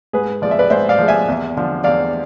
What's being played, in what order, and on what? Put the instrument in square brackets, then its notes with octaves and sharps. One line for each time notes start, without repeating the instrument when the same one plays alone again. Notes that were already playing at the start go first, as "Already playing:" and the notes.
[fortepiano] G#2 G#4 B4
F3 G#3 D5
E5
B4 D5
G#2 C5 E5
D5 F5
F3 G#3
E5 G#5
E2
D3 F3
E2 D5 F5